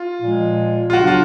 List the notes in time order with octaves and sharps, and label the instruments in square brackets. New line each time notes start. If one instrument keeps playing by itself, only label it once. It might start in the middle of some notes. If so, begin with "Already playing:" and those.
Already playing: [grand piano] F4
[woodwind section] A#2 F3 G#3
[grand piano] F4
[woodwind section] C#3 F#3 B3 D4 [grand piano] F#4
[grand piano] F4